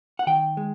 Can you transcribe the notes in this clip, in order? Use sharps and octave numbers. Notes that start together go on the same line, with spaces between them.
F#5
D#3 G5
G#3